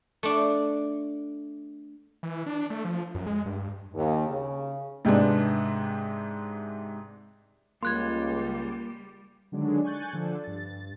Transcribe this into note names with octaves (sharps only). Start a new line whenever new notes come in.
A3 D4
E3
D4
A3
F3
F#2
G#3
G2
D#2
C#3
G#2 C3 G#3 B3 D4
C#2 G3 A#3 C6 F#6 G#6
D3 D#3 F#3 G#3 D4
G#5 C#6 F#6 G6 A6
D3 F3 D4 A4
G2 A6